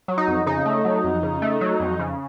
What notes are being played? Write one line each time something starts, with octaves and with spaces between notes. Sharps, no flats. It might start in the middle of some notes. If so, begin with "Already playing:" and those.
F#3
D#4
F2
C#3 D#4
A3
F#3
F2
C#3
A3
F#3
F2
C#3